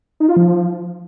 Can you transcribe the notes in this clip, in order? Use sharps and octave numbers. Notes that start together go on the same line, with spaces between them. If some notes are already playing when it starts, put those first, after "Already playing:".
D#4
F4
F3